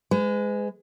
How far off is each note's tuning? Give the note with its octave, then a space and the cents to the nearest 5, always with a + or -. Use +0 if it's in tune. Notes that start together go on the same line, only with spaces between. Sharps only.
G#3 +0 B4 +45